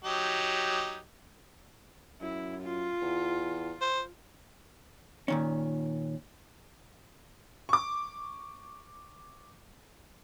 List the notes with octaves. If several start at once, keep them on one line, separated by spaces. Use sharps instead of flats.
F#3 D#4 G4
F#2 E4
F4
E2
C5
A#2 D#3 C#4
C#6 D6